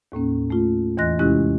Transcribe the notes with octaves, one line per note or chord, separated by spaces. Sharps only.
D#2 A2 A#3 C#4
A3 F4
E2 E3 D#5 C6 F#6 A#6
C3 G#3 C#4 E4 G4 F#6